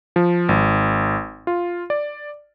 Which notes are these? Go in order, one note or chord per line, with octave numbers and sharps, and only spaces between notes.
F3
G#1
F4
D5